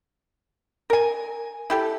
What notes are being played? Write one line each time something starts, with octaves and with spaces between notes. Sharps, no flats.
A#4 G#5
E4 G4 A4